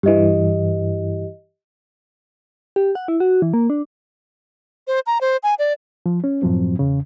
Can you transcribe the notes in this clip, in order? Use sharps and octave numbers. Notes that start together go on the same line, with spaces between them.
G2 E3 G4 D#5
G4
F#5
E4
F#4
E3
A#3
D4
C5
A#5
C5
G#5
D5
F3
C#4
F#2 A2 F3 F#3 C4
E2 C#3